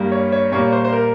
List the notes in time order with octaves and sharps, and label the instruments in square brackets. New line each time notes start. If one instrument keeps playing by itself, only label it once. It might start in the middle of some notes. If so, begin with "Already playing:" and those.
Already playing: [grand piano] G2 G3 A#3
C#5
C#5
A#2 G3 A#3 C#5
C5
C5
A#4